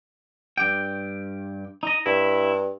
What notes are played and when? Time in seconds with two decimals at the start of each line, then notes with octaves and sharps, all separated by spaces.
0.58 G2 G4 G5
1.83 D#4 D#5
2.06 G2 E4